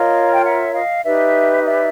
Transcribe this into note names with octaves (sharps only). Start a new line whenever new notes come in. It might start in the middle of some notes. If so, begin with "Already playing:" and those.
Already playing: F4 A#4 C#5 D#5 F5
G5
E5 F#5
D#5 F5
D#4 G4 B4 D5 E5
D#5
D5 E5